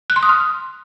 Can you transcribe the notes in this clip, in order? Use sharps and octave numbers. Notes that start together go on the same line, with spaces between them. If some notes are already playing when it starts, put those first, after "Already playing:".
F#6
C6
D#6
F6